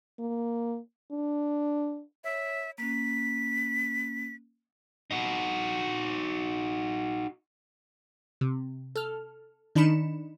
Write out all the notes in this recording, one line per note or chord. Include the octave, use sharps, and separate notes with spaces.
A#3
D4
C#5 E5
A#3 C#4 B6
D#4 F#4
C3
A4 F6
D#3 D4 D#4 B5 C#7 E7